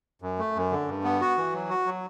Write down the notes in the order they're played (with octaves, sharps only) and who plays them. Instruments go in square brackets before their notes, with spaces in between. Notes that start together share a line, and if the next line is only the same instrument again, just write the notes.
[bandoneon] F#2
A3
F#2
D3
G2
B3
F#4
E3
F#3
F#4
F#3